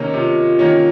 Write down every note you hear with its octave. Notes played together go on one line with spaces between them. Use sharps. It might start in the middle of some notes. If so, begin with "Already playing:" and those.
Already playing: C3 D#3 A#3 C#4
C3 F4
D#3 A#3 C#4